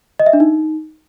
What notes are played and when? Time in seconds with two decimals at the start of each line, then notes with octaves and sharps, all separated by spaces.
0.19 D#5
0.26 E5
0.33 D4
0.40 D#4